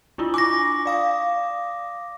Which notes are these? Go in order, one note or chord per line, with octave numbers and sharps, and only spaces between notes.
D4 E4 F4
G#5 C#6 D6 A#6
D5 F5 D#6